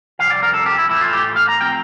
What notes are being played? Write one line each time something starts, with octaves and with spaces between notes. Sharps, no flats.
F2 C3 G3 F5
D5
A#4
A4
G4
E4
A2 E3 A3 E4
F4
G4
F5
A#5
F3 C4 G5